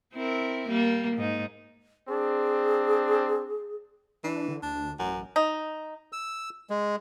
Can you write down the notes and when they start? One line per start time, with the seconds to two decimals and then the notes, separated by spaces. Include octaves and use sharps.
0.14 C4 E4 A#4
0.68 G3 A#3
1.16 G#2 D#4
2.08 C4 D4 G#4
4.24 E3 D4
4.48 D3
4.63 D2 D4
4.99 A1 F#2
5.36 D#4
6.13 E6
6.70 G#3